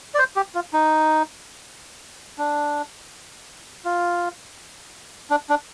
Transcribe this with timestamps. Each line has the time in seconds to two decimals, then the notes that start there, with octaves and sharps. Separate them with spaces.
0.14 D5
0.19 C5
0.36 G4
0.55 F4
0.73 D#4
2.38 D4
3.85 F4
5.30 D4
5.49 D4